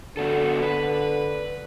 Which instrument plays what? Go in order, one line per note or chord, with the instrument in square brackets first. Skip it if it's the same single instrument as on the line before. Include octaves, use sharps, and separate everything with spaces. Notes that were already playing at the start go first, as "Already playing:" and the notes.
[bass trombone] D3 [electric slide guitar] B3 F#4 A4
[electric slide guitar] B4